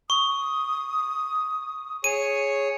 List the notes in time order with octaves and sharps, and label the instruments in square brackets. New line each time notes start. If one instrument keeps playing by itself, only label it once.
[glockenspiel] C#6 [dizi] D#6
[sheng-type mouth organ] G#4 C#5 [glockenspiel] D#7